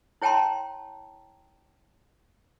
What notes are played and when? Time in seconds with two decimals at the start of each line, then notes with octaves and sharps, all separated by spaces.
0.22 E4 C#5 G5 A5 A#5 C6